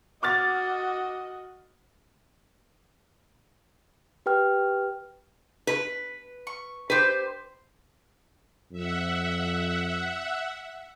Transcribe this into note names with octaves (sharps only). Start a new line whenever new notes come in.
F#4 D#5 D6 F6 A6
G4 B4 G5 F6
B4
C#6
G4 B4 C5 G6
F2 E5 F#5